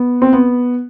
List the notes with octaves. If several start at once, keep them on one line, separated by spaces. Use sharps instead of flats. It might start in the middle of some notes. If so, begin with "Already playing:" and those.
Already playing: B3
C4
B3